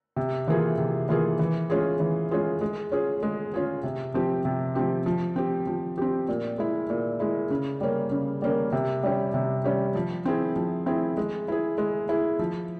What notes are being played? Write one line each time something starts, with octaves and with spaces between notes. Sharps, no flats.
C3
E3 A#3 F4 G#4
C3
E3 A#3 F4 G#4
E3
G#3 C#4 F4 G#4
E3
G#3 C#4 F4 G#4
G#3
C#4 F4 G#4
G#3
C#4 F4 G#4
C3
F3 C4 G4
C3
F3 C4 G4
F3
C4 G4
F3
C4 G4
A#2
G#3 E4
A#2
G#3 E4
C#3
G3 A#3 C#4
C#3
G3 A#3 C#4
C3
G3 C#4 G4
C3
G3 C#4 G4
F3
C4 E4 G#4
F3
C4 E4 G#4
G#3
E4 G#4
G#3
E4 G#4
F3